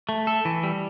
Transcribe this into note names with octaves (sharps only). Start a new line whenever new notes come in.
A3
A4
E3
G3